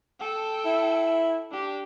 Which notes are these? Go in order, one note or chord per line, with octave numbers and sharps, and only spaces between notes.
A4 G5
E4
D4 G4